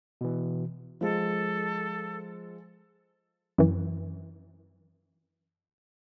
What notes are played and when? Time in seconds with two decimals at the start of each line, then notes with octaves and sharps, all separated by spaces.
0.21 B2 E3
1.01 F3 G#3 A4
3.58 F#2 E3